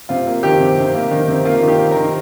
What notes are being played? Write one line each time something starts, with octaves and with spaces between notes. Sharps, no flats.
C3 F4
A#3
D#3 G4
C3
C3
A#3
D#3
C3
A#3 F4
D#3
G4
A#3
A#4
D#3